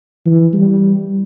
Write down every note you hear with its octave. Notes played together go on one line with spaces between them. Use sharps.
E3
G3